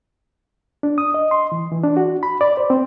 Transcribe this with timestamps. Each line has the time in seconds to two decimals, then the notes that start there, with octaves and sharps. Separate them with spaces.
0.83 D4
0.98 D#6
1.14 D#5
1.31 C6
1.52 E3
1.72 E3
1.84 D4
1.97 F#4
2.23 B5
2.41 D5
2.57 C5
2.70 C4